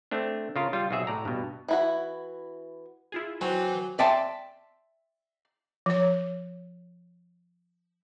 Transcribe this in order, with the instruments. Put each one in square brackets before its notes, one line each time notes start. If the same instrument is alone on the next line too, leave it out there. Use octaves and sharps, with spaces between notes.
[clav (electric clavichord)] A3 C4 D4
C#3 F4 A#4
G3 F4
B1 C3 F#4 G#4 E5
A2 D5 A#5
G2 B2
[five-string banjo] E3 E4 F#4
[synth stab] E4 F4 G#4
[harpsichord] F#3 [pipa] C4 [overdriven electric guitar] B4 G#5
[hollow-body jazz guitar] D5 E5 G5 A5 C6
[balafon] F3 C#5